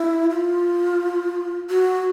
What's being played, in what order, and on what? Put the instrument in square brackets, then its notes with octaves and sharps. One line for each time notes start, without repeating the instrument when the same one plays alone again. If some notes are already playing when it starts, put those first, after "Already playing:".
Already playing: [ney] E4
F4
F#4